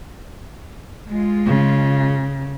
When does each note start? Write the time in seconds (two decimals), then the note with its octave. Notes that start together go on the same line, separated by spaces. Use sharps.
1.08 G#3 F4
1.46 C#3